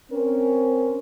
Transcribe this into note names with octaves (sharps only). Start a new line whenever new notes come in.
C4 C#4 A#4